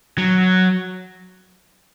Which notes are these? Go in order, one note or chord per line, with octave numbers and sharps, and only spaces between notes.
F#3